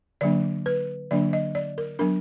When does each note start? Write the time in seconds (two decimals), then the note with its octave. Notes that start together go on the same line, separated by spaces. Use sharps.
0.21 D3 F#3 A#3 D4 D5
0.66 B4
1.11 D3 F#3 A#3 D4 D5
1.33 D#5
1.55 D5
1.78 A#4
1.99 F#3 B3 D4 A#4